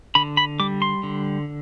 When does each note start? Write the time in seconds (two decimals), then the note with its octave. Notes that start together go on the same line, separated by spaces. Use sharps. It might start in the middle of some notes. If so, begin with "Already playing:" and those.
0.15 D3 B5
0.37 B5
0.60 G3 D6
0.82 C6
1.03 D3